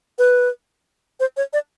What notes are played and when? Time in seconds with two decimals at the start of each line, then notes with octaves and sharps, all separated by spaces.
0.19 B4
1.20 C5
1.37 C#5
1.53 D5